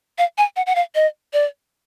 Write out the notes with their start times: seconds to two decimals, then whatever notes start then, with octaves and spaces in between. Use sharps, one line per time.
0.18 F5
0.38 G#5
0.56 F#5
0.66 F#5
0.75 F5
0.95 D#5
1.33 D5